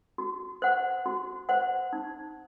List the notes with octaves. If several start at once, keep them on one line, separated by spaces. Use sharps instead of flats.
F#4
C5 F#5
F#4
C5 F#5
D#4